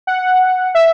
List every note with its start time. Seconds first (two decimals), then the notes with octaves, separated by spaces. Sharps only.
0.07 F#5
0.75 E5